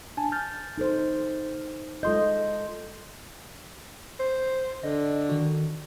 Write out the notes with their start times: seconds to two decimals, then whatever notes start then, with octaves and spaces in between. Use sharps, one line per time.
0.17 D4 G#5 A5
0.32 F6 G6 A6
0.78 D#4 A4 C5
2.03 G#3 F4 A4 D#5 C6 G6
4.19 C5
4.83 D3 D#5
5.29 D#3 F#4